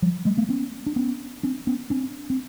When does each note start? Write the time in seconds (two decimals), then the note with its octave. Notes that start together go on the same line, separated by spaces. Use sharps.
0.02 F3 G3
0.25 G3 A3
0.37 A3 B3
0.49 B3 C#4
0.86 D4
0.96 B3 C#4
1.43 C4 D4
1.67 B3 C#4
1.90 C4 D4
2.30 C4